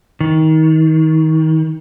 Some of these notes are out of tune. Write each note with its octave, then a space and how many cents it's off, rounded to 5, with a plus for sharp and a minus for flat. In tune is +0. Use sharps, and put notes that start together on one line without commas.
D#3 +30